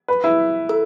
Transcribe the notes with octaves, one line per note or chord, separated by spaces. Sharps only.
B4
E4
A4